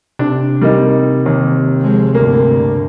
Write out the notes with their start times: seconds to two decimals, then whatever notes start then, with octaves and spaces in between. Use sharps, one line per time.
0.19 C3 D4
0.61 G3 A#3 D#4
1.26 D#2
1.79 F3 G#3
2.15 D2 G2 A#3